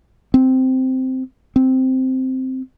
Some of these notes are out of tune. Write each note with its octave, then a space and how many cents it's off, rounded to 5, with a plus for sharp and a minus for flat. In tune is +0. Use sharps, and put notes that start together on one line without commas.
C4 -10
C4 -5